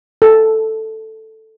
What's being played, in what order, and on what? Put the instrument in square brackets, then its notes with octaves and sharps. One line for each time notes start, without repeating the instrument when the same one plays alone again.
[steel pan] A4